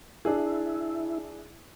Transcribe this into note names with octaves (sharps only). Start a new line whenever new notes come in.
D4 E4 G#4